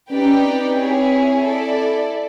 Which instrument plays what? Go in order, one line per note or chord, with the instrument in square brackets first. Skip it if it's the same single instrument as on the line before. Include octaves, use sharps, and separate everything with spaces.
[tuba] C#4 [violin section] D#4 G4 B4 D5 G5
[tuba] C4
[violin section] E4 G#4 C#5
E4 A4 D5